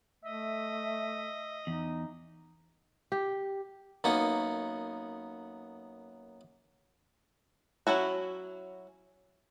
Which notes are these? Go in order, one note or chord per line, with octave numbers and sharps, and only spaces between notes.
A3 D#5 E5
E2 D#4
G4
F#2 A#3 B3 D#4 C#6
F#3 C#4 E4 F#4